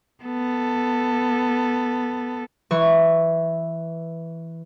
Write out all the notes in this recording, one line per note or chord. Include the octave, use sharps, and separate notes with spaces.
B3 A4
E3 C#6